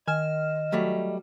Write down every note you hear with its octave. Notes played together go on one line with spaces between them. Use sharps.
D#3 D#5 G#5 F6 E7
F#3 G3 A3